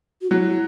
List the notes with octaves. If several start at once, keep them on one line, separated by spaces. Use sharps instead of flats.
F#4
F#3 E4